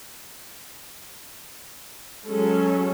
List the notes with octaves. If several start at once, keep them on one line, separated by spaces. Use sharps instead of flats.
F#3 G#3 C#4 A4